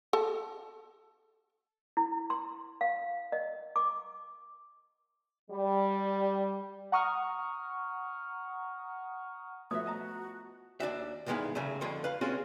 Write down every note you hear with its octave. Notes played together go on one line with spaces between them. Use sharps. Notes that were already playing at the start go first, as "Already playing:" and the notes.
A4 A5
E4
C6
F5
D#5
D6
G3
F#5 A#5 C#6 D#6 F6
F3 A3 B3 F#4 C#5 E5 D#6
D#5 A5 A#5
D#2 D4 F#4 E5
B1 G2 D#3 G#3 B3 E4
A2 C#3 F#3 A3
F2 A2 D3 F#4 C#5 C6
B4 F5 B5
G#3 C4 C#4 F4 F#4 G#4